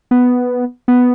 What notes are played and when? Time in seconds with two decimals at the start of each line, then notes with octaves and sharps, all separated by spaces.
0.11 B3
0.88 B3